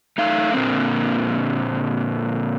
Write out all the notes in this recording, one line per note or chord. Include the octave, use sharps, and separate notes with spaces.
A3 D#4 F5
A#2 D3 A#3 C4